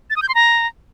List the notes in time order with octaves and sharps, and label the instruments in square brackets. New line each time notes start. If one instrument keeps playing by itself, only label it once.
[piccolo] A6
D#6
G6
C6
A#5